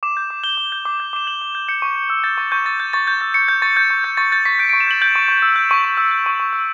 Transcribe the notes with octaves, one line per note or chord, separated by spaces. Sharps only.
D6 E7
G6
D6
G6 G7
D6
G6
D6
G6
D6 E7
G6 F#7
D6
G6
G6 C#7
C#6
C#6
E6
G6 A6
C#6 A6
C#6 G6
E6 A6
G6
C#6 A6
C#6 G6
E6 A6
C#6 C#7
G6
C#6 A6
G6
C#6
G6
C#6 A6
G6 A6
C#6 B6
G6 D7
C#6 D7
E7
G6 F#7
G6 F#7
C#6
C#6
E6
G6
C#6
C#6
E6
G6
C#6
C#6
E6